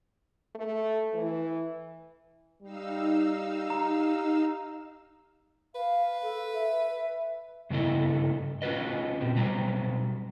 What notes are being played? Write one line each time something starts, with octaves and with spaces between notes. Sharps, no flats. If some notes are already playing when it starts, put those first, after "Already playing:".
A3
E3
G3 D#4 F5 E6
G4 A#5
B4 F5
A4
E5
G2 C#3 B3 E4 A4 D#5
C#4 F4 F#4 B4 D#5
B2 C4
B2 F#3 G3 A#5